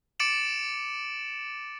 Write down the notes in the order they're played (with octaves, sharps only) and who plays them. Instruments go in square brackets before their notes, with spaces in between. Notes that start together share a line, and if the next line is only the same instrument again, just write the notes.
[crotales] D6 A6 C#7 D7 E7 F#7